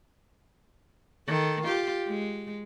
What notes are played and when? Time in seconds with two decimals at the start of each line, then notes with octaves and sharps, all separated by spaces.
1.27 D#3 A4
1.64 F4 G4
2.07 G#3